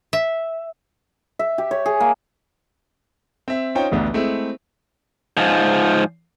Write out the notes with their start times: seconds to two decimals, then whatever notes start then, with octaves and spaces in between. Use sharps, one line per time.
0.13 E5
1.39 E5
1.58 G4
1.71 C#5
1.86 G#4
2.00 A#3
3.48 C4 E5
3.75 C#4 D#4 F4 C5 C#5 G5
3.91 A1 D2 B3 D4
4.14 G#3 A3 C4 E4
5.37 G#2 F3